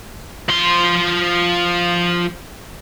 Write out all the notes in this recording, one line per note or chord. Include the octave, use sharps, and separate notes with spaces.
F3 C6